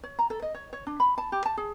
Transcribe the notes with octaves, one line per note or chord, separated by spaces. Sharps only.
C#5
A#5
A4
D#5
C#5
C#5
D4
B5
A5
G4
A5
G#4